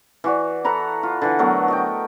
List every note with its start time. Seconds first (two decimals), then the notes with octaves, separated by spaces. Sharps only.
0.24 E3 F#4 D5
0.64 A4 F#5 A#5 B5
1.03 F4
1.22 D3 E3 F#5
1.39 F#3 A3 B3 A#4
1.68 F#4 D#5 G5